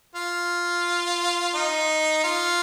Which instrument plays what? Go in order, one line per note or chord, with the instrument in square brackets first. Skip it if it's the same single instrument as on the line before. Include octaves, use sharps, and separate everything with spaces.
[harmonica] F4
D#4
F4